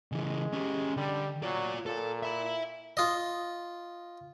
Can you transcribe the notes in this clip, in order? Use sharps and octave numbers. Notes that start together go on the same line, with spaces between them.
C#3 E3 G#3
C#4 G4
D3 G3
F#3 F4 D5
A#2 A4
E5 B5
F4 D#5